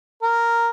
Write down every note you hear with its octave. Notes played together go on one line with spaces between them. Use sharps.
A#4